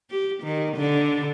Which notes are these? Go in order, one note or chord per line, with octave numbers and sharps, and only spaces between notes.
G4
D#3
D3